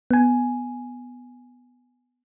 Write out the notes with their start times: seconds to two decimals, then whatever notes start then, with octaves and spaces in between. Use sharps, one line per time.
0.11 B3 G#5